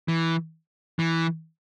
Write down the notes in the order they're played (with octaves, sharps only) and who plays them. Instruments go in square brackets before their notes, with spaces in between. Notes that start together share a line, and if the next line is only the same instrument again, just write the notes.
[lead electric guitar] E3
E3